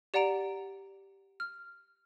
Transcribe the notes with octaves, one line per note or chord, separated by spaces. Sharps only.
G4 D5 F#5 A#5 D7 F7
F6